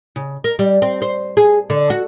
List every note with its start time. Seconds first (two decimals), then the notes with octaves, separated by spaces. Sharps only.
0.16 C#3
0.44 A#4
0.59 G3
0.82 C4
1.02 C5
1.37 G#4
1.70 D3
1.90 F#4